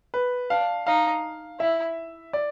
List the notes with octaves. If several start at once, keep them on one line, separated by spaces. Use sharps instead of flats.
B4
D4 F5
D#4 F5
E4 E5
D5